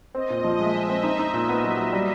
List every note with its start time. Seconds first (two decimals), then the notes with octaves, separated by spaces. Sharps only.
0.15 C4 D#5
0.30 A#2
0.44 F3
0.60 G#3 E5
0.74 G#3
0.89 C4
1.03 D#4
1.19 D#4
1.34 A#2
1.49 B3
1.64 F#3
1.78 F#3
1.93 G3